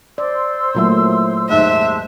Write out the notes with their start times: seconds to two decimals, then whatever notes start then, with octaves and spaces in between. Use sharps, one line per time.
0.18 C5 D5 C6 E6
0.75 A#2 F#3 A3 A#3 E4
1.50 D#2 G#2 C5 E5 A5 F#6